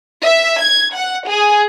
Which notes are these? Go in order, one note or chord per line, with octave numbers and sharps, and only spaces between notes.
E5
G#6
F#5
G#4